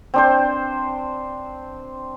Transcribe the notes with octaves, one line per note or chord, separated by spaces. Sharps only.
C4 D4 C5